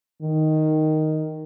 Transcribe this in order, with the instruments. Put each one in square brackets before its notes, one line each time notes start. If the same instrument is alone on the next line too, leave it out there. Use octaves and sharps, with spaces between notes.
[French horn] D#3